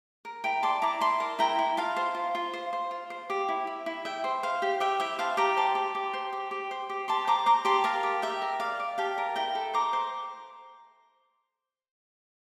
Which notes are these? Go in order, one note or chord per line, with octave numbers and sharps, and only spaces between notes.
A#4
E4 G5 A#5
D5 A5 C6
E4 A#5 D6
E4 A5 C6
A#4
E4 G5 A#5
E4
F4 F5 A5
C5
F4
F4
C5
C5
F4
C5
G4
E4
E4
E4
E4 E5 G5
C5
C5 F5
G4
G4 E5 G5
E4 E5 G5
C5 F5 A5
G4 G5 A#5
C5 A5 C6
G4
G4
C5
G4
G4
C5
G4
G4 A5 C6
C5 A#5 D6
C5 A#5 D6
G4 A5 C6
A#4 F5 A5
G4
G4 E5 G5
A#4
D5 F5
D5
G4 F5 A5
A#4
E4 G5 A#5
A4
C5 A#5 D6
C5